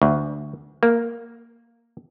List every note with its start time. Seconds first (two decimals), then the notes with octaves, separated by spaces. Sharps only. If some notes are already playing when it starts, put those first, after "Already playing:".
0.02 D2
0.83 A#3